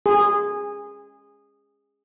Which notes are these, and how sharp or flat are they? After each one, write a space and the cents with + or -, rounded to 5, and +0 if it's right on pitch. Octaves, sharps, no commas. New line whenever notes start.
G#4 -20